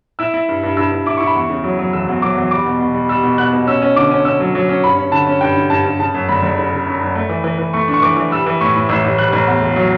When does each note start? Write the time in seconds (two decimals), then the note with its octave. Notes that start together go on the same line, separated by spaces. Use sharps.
0.19 E4 E6
0.34 E4
0.49 G2
0.63 G2
0.77 G2 E6
0.91 G2
1.06 E4 D6
1.17 E4 C#6
1.27 B5
1.35 E2 C#6
1.50 C#3
1.64 F#3
1.79 F#3
1.93 E1 E6
2.08 E2
2.22 F#3 D6
2.37 E2
2.51 G3 D6
2.66 B2
2.80 B2
2.94 G3
3.09 G3 E6
3.24 B2
3.38 B2 F#6
3.53 B2
3.67 C#4 E6
3.82 C#4
3.96 D3 D6
4.11 C#4
4.25 C#4 E6
4.40 F#3
4.55 F#3
4.69 C#4
4.84 G2 B5
4.98 C#4
5.12 D3 A5
5.27 C#4
5.41 G2 G5
5.56 D3
5.70 G2 A5
5.85 G2
5.99 C#3 A5
6.14 F#2
6.28 G1 B5
6.42 G1
6.58 C#3
6.72 C#3
6.86 F#2
7.01 F#2
7.15 A3
7.29 E3
7.44 E3
7.58 E3
7.73 A3 C#6
7.88 D4
7.94 C#6
8.02 E3 D6
8.17 E3
8.31 G3 E6
8.46 E3
8.61 A2 C#6
8.76 A2
8.89 A1 E6
9.04 A1
9.18 G3 F#6
9.33 A1
9.47 E2
9.62 E1
9.76 F#3